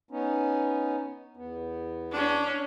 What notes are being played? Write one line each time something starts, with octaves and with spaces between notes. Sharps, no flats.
B3 C#4 D#4
E2 B3
C#4 D4